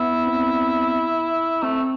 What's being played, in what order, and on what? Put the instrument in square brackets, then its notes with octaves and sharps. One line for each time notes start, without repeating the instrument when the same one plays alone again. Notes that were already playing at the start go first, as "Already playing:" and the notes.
Already playing: [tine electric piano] B3 [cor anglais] E4
[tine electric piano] C4
[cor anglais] A3 [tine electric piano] C4